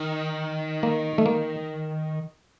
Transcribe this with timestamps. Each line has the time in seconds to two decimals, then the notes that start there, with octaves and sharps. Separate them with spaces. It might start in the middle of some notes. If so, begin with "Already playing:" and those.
Already playing: D#3
0.83 A#3
1.18 A3
1.26 A#3